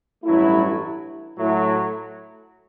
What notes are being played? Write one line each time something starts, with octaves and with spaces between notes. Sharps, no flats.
A1 G2 F#3 A3 E4
A2 F#3 A3 E4